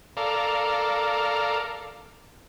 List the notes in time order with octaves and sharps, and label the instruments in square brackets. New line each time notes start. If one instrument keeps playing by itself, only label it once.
[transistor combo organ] A4 A#4 D5 F5